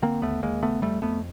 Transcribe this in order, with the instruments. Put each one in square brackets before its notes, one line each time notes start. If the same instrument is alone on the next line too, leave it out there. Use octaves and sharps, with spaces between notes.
[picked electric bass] D3 A#3 C4
D#2 A3 B3
D#2 G#3 A#3
C#3 A3 B3
F2 G3 A3
F2 A3 B3